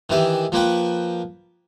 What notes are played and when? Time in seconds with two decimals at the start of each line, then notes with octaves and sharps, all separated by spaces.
0.09 D#3 E3 G4
0.52 F3 A#3 B4 G5